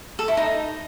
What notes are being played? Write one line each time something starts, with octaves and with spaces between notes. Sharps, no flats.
A4
E4
D#4